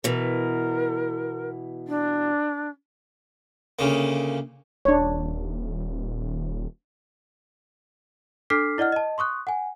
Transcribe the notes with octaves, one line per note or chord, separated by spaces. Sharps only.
B2 E3 A#4
D4
D2 C#3 A#3
D#1 D4 C#5
D4 A4 D6 F6 B6 C7
E4 D5 D#5 F#5 F6
D#5 A5
C6 C#6 D#6 F#6
F#5 G#5